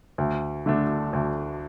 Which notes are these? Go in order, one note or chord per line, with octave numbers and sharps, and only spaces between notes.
D2
D3 A3 D4
D2